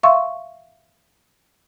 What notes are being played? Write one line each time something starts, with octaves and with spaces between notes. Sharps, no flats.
E5 F5 C6 C#6 E6